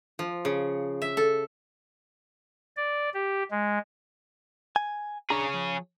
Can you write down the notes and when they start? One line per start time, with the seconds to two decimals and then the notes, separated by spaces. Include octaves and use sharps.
0.19 F3
0.45 C#3
1.02 E5
1.17 A4
2.77 D5
3.14 G4
3.51 G#3
4.76 G#5
5.30 B1 D4 G#4 C#5 A#5
5.54 F3